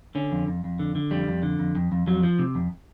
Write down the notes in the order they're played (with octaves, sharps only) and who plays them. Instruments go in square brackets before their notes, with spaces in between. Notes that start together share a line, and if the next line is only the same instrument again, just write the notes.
[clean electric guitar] D3 C#4
F2
F2
F2
D3
D3
F2 G3
F2
D3
F2
F2
F2
F2 F#3
F3
C3
F2